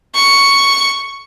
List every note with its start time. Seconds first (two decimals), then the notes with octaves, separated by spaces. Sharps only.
0.15 C#6